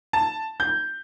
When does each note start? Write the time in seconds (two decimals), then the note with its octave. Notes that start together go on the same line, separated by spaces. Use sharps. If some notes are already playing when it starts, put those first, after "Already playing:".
0.13 A5
0.60 G6